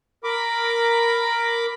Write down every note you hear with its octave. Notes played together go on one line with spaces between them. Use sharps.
A#4 B5 D6